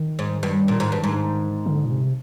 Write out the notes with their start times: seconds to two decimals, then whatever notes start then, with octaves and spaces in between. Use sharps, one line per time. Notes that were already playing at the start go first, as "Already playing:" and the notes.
Already playing: D#3
0.19 G#2
0.43 G2
0.68 A#2
0.80 G#2
0.92 G2
1.04 G#2
1.66 D3
1.86 A#2
1.91 C3